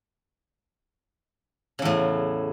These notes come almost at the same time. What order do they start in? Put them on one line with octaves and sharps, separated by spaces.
C#3 E2 A2